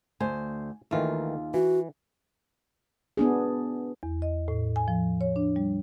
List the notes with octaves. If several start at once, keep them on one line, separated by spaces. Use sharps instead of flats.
D2 C5 G#5
D#2 D#3 E3 A3 F4
E3 F#4
B3 D4 G#4
E2
D#5
A2
G#5
F3
C#5
D4
G3